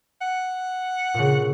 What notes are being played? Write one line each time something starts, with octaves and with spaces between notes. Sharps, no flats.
F#5
A#2 C#3